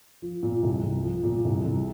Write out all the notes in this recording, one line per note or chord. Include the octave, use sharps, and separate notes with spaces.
F3
A#2
C2
C2
F3
A#2
C2
C2